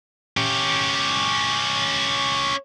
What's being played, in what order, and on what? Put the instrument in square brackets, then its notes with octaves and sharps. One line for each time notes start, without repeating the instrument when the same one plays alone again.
[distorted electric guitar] C#4 G4